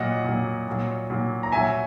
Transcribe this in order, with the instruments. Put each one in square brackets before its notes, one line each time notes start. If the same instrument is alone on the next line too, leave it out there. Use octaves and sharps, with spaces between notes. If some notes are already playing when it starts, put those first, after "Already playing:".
Already playing: [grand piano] A#2 F#3 D#5 F#5
A#2 F#3
A#2 F#3
A#2 F#3
A#5
A#2 F#3 E5 G#5